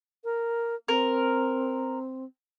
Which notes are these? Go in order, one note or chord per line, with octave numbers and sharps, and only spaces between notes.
A#4
C4 A#4